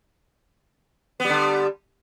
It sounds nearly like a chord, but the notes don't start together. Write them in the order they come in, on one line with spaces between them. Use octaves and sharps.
B3 G3 D3